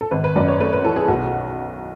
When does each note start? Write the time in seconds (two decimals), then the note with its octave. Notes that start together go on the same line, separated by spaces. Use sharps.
0.01 A4
0.11 G#1 B4
0.24 B4
0.36 F#2 D5
0.48 C#5
0.60 A3 B4
0.73 B4
0.85 E3 A4
0.96 G#4
1.08 B1 F#4